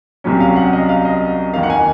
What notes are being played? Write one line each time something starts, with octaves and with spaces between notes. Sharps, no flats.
C2 C3 F#3 C#4
F5
F#5
D#5
F5
D#5
F2 D#3 A#3 F5
F#5
G#5